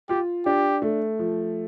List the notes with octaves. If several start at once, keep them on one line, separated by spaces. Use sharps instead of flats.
F4 G4
D4 G4
A3
F3